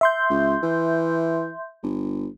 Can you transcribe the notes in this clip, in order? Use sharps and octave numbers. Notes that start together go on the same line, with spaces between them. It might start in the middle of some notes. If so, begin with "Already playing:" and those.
E5 C6 G6
C#2
E3
G1